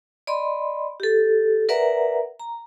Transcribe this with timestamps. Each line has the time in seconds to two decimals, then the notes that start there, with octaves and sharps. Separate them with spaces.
0.27 D5 D#5 B5 C6
1.00 G4 A4
1.69 A#4 B4 D5 E5 F#5 A#5
2.40 A#5